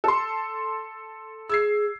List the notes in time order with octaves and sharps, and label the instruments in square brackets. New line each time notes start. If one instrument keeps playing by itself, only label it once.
[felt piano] A4 C6
[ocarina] G#4 [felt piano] E6 G#6 C7